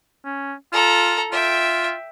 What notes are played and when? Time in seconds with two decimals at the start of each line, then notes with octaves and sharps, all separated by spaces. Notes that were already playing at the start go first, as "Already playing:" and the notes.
0.25 C#4
0.73 F4 A4 A#5
1.32 F4 E5 G5